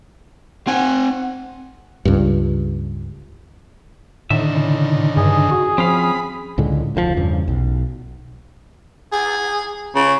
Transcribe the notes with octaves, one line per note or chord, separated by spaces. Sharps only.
C4 F#5 G#5
C#2 G2
A2 D3 D#3 E5
C#3
G2 G#4
F#4
F3 C4 C#4 F5 B5
C#2 A2 D3 G#3
F1 D2 C3 F3
E2 G2 C#3
B1
G#4
C#3